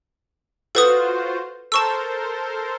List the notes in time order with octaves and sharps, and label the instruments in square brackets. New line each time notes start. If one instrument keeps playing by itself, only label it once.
[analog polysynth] F4 F#4 C5 [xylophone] A4 B4 D#6
[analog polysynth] A4 A#4 C5 [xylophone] A5 C#6 E6